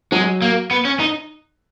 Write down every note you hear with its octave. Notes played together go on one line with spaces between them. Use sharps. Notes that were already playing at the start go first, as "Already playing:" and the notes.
F#3 G#3
A#3
B3
C#4
D#4